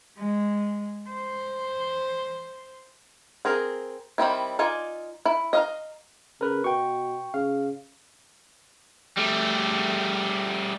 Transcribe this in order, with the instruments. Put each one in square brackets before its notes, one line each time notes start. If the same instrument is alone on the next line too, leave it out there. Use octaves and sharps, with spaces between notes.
[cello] G#3
C5
[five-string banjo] C4 G#4 A#4
D#3 G3 C4 E4
D#4 F4 D5 G#5
E4
D#5 F5 A#5
[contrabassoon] C#3 [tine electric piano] A#4 B4
[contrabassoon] B2 [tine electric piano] G5 C#6
[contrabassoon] C#3 [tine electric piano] F5
[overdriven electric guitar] G3 A3